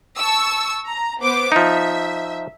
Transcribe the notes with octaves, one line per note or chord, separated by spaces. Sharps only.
A5 C#6 E6
A#5
B3 C5 D6
F3 D#4 E5